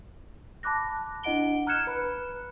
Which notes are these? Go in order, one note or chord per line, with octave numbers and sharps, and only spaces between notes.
A5 B5 D6 F#6 A#6
D4 E4 D#5 F#5 D7 G7
A#5 F6 F#6 G#6 C#7 E7
B4 B5 F#6